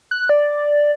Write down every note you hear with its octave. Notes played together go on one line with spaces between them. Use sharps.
F#6
D5